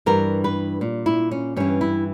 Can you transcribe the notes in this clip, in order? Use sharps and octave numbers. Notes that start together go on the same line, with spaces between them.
G2 E3 A#4
B4
A#2
E4
C#4
G2 E3 C#4
E4